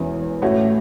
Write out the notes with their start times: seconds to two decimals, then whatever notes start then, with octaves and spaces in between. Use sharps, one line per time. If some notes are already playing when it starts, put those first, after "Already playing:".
Already playing: E1 E2 E3 C#4
0.42 A1 A2 A3 F#4 C#5